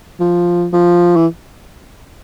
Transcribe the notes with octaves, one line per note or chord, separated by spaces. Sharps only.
F3
F3
E3